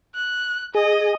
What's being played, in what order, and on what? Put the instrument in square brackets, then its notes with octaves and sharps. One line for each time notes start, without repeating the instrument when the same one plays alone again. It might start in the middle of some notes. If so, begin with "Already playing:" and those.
[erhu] F#6
[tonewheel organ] G#4 [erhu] D#5